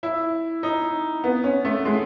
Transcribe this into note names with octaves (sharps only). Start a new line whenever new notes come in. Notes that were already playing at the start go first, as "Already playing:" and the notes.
E4
D#4
B3
C#4
A3
G#3